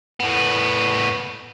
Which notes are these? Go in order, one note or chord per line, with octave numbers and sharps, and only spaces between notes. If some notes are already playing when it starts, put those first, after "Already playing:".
A2 B3